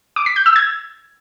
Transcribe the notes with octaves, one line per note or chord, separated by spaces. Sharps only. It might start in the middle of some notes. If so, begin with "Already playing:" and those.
D6
B6
G6
E6
G#6